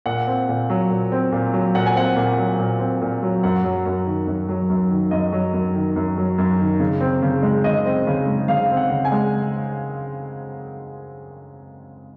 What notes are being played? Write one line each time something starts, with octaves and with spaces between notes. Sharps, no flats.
A#2 F#5
C4
A#2
F#3
A#2
C4
A#2
F#3
A#2 F#5
G#5
C4 F#5
A#2
F#3
A#2
C4
A#2
F#3
F#2 F#5
F#3
F#2
D#3
F#2
F#3
F#2
D#3
F#2 D#5
F#3
F#2
D#3
F#2
F#3
F#2
D#3
C#3
C4
C#3
G#3
C#3 D#5
C4
C#3
G#3
C#3 F5
C4
F#5
C#3
G#5
G#3